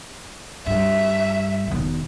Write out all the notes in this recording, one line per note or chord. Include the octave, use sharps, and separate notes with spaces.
G2 E5
E1 D#3